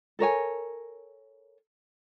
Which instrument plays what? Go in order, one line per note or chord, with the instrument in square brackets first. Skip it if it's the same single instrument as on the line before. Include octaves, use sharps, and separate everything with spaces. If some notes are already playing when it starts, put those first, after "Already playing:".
[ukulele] A4 A#4 C#5 G#5